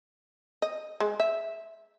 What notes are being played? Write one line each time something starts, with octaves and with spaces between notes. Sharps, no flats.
D#5
G#3
E5